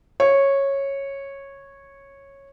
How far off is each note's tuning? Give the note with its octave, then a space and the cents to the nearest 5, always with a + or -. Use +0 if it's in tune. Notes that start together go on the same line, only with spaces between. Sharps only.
C#5 -10